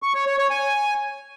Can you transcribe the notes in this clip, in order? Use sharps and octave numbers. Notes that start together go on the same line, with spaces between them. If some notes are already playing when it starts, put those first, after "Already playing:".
C#6
C#5
C#5
C#5
G#5